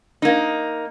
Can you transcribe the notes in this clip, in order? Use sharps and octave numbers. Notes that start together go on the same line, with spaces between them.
A#3 D#4